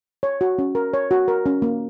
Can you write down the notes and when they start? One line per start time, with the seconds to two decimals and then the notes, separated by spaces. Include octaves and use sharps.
0.23 C#5
0.41 F#4
0.59 C#4
0.75 A#4
0.94 C#5
1.11 F#4
1.28 A#4
1.46 C#4
1.62 A#3